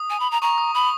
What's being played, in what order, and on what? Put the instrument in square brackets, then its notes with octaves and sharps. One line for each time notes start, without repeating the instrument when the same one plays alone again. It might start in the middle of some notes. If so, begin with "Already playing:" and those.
Already playing: [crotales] D#6
[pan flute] G#5
B5
A#5
[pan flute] A#5 [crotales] C#6
[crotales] D#6
[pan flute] B5 [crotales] D#6